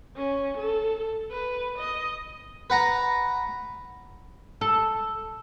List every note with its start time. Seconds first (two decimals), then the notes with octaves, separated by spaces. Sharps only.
0.17 C#4
0.58 A4
1.31 B4
1.79 D#5
2.70 B4 F#5 A#5
4.61 A4